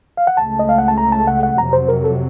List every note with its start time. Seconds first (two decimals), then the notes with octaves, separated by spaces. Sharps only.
0.17 F5
0.27 F#5
0.37 C#2 C#3 A3 A5
0.59 D#5
0.69 F5
0.78 F#5
0.88 A5
0.98 A#5
1.12 A5
1.27 F#5
1.43 F#5
1.58 F2 C3 F#3 A#5
1.73 C5
1.88 A#4
2.04 A4